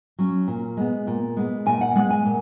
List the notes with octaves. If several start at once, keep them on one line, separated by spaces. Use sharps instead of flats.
F#3 C#4
A#2
G#3 B3
A#2
G#3 B3
A#2 G#5
F#5
G#3 B3 F#5
G#5
A#2